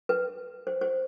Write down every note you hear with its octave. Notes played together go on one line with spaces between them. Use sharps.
B4
C5
C5